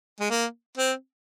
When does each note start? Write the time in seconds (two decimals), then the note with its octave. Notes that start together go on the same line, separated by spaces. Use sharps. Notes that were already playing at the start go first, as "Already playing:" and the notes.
0.20 G#3
0.31 A#3
0.78 C4